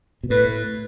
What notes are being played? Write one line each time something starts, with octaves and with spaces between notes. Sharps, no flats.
B2
A2 B4